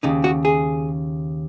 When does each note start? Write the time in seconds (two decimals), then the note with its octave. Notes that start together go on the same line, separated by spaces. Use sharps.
0.03 D#2 C#3 D#4
0.24 F#4
0.45 G#4